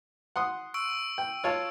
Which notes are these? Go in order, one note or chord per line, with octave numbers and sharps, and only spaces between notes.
F#5 C6 D#6
C#6 E6 D7
G5
F4 C#5 A5